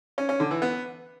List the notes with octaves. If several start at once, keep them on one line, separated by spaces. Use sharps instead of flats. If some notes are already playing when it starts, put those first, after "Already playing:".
C#4
C#4
D3
E3
B3